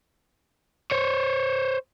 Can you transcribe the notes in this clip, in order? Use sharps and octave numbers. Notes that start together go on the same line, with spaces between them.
C5 C#5